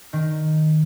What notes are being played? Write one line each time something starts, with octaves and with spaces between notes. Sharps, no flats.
D#3